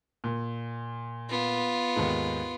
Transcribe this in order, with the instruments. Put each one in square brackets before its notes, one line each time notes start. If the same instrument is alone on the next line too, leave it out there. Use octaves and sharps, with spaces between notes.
[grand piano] A#2
[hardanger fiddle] B3 F4
[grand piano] D#2 G#2